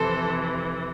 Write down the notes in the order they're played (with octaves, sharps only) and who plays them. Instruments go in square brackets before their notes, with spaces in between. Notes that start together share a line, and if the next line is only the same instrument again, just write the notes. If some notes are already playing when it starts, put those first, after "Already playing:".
Already playing: [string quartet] F2 C3 E3 A4 C5